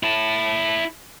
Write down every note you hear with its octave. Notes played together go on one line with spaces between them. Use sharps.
E4 A5